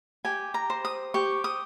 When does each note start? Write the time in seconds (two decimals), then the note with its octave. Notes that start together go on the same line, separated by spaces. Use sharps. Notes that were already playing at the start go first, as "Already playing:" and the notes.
0.25 G4 G#5
0.54 A#5
0.70 C5
0.85 D#6
1.14 G4 C#6
1.44 D#6